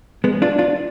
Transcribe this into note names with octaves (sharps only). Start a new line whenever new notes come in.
G#3 B3
D4 F4
D4 F4